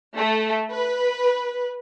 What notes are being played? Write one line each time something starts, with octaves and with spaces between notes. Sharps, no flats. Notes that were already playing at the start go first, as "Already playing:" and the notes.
A3
B4